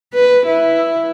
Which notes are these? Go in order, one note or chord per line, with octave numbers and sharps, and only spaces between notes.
B4
E4